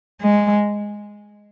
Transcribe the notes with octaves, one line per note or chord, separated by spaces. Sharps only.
G#3